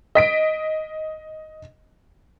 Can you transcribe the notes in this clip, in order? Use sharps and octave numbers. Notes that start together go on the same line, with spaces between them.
D#5 B6 D7